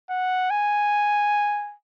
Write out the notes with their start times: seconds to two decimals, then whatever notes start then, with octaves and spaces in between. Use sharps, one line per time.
0.10 F#5
0.50 G#5